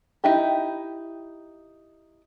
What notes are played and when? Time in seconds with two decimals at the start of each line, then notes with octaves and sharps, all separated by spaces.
0.24 D#4 E4 G4